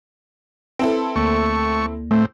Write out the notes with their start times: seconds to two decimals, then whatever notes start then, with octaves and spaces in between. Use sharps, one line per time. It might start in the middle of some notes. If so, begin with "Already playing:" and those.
0.79 C4 E4 A4 B4 A5
1.16 D2 A3 A#3 C#6
2.11 A2 A3 C4